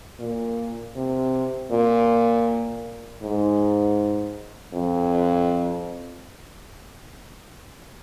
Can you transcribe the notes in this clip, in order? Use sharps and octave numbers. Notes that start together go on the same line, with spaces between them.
A#2
C3
A#2
G#2
F2